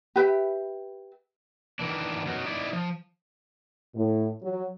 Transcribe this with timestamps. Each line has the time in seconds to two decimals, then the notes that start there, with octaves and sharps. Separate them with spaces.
0.16 G4 B4 E5 G5
1.79 D#3 E3 D4
2.26 F#3 B3 C#4 D#4 F#4
2.46 D#4 E4 D5
2.73 F3
3.96 A2
4.43 F#3